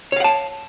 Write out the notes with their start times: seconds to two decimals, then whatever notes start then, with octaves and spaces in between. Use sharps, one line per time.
0.12 C#5
0.16 F5
0.20 F#5
0.24 A5